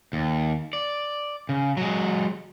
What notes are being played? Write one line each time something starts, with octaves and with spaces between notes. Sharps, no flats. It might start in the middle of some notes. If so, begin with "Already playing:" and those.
D#2
D5
C#3
F#3 G#3